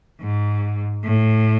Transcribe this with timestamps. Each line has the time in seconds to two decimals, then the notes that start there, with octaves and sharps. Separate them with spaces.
0.22 G#2
1.05 A2